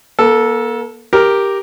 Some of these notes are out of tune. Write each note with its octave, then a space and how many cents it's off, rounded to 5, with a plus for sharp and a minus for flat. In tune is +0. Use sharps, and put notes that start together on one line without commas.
A#3 +40 A4 +0
G4 +0 A#4 +0